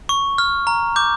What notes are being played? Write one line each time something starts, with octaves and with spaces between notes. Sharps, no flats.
C#6
F6
A#5
D6 G6